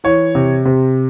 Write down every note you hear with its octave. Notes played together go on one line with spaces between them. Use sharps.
E3 C#5
C3
C3